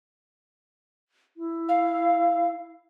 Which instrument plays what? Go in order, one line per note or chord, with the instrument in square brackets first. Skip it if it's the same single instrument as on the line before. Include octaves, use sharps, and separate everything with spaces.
[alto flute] E4
[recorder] F5